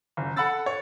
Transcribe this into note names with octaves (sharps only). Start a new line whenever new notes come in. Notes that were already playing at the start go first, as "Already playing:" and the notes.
F#1
A4 F#5 B5 E6 A6
C#5